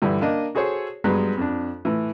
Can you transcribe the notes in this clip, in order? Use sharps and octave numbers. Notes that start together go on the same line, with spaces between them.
G2 D3 E3
A#3 D4 D#5
F#4 G#4 A4 C5 C#5
G2 F#3 G#3 B3
F2 D4
A2 E3